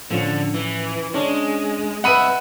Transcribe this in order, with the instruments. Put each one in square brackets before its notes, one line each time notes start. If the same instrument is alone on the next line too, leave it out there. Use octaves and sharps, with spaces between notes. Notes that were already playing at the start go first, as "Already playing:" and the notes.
[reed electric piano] A2 F3 C#4 [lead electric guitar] D3
[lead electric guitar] E3
[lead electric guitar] G#3 [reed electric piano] C#4 D4 C#5
[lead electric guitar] C2 E5 [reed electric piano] B4 D#5 [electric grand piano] F#5 B5 D#7